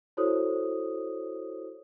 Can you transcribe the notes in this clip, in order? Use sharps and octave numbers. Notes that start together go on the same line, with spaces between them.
E4 F#4 A4 C5 C#5 D#6